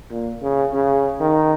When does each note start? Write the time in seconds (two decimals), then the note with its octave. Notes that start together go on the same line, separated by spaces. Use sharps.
0.10 A#2
0.42 C#3
0.73 C#3
1.20 D#3